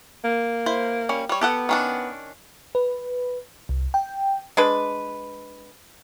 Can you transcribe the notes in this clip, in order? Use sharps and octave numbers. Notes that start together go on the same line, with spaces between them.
A#3
E4 C5
G3 C#4
G3 C#5
B3 G4 A4 F#5
D#3 C#4 D4
B4
C2
G5
G#3 D4 B4